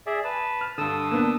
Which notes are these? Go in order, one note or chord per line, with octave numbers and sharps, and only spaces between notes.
G#4 D5 E5
B4 A5
F6
G2 D3 A5 D#6 E6
A#3 B3 D4